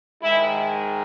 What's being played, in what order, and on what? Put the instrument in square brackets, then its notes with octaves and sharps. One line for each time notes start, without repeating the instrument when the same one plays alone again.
[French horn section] G#2 D#3 G#3 E4